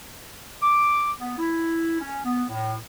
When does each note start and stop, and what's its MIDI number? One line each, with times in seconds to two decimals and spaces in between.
0.62 1.09 86
1.20 1.36 59
1.39 2.01 64
2.01 2.22 61
2.24 2.44 59
2.49 2.75 45